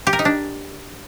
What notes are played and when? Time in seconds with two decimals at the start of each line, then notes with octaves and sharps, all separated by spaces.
0.07 G4
0.13 A#4
0.19 D#4
0.25 D4